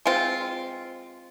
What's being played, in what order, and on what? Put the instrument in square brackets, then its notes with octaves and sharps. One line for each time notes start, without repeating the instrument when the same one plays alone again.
[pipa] G#3 C4 F4